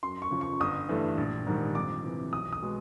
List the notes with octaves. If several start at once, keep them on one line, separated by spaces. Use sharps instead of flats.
F#2 C6
C#6
C#3 F3
C#6
G1 D#6
G2 E3 A3
A#1
G#2 D#3 G3
F2 D6
C3 E3
B1 D#6
D#6
B2 G#3